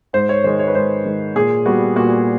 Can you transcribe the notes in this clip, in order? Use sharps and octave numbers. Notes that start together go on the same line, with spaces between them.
G#2 C5
C#5
D#3 G#3 C5
C#5
B4
G#2 C5
D#3 G#3
A#2 G#4
G3 B3 F#4
A#2 F#4